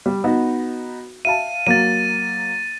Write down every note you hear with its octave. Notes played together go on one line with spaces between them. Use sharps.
G3
B3 D#4 F#4
E5 F5 A5 D#7
F#3 A#3 A6 D#7